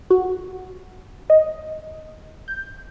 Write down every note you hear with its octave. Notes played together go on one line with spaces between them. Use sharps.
F#4
D#5
G6